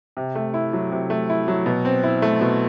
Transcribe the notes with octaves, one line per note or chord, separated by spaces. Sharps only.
C3
A3
E4
F#3
C3
A3
E4
F#3
B2
C4
E4
A3
B2